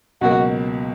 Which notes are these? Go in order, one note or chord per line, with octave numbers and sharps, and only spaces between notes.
C#2 B2 F#3 A#3 F#4